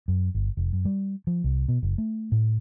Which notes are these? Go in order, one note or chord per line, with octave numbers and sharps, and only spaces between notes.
F#2
G1
F1
F#2
G3
F3
C2
B2
F#1
A3
A2